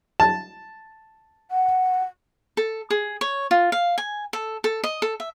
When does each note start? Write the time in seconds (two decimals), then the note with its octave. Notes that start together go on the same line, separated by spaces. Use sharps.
0.20 A5
1.51 F#5
2.57 A4
2.90 G#4
3.21 C#5
3.51 F4
3.72 F5
3.98 G#5
4.33 A4
4.64 A4
4.84 D#5
5.02 A4
5.20 E5